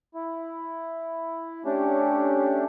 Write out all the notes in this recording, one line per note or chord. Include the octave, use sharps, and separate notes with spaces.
E4
A3 C#4 D4 G4